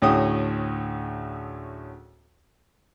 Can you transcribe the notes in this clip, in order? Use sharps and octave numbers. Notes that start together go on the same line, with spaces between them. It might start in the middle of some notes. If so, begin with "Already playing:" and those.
D2 A2 C#4 G#4 G5 D#6